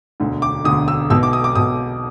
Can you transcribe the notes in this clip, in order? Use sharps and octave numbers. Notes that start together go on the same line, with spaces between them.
E1 D2 D3
D6
E1 D2 D3 D#6
E6
B1 B2 E6
D6
D#6
D6
B1 B2 D#6